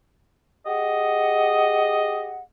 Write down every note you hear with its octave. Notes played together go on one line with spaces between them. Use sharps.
G4 G#4 D#5 F#5